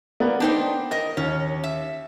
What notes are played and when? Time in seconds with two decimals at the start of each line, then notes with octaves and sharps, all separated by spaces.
0.20 A#3 B3 D5
0.40 B3 D4 D#4 C5 G5
0.91 A#4 D#5 A#6
1.17 D#2 C#4
1.64 E5